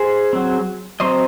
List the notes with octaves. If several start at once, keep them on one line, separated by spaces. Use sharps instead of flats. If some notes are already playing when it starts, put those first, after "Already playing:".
Already playing: G#4 C5
F#3 C4
F#3 C4 C5 D#5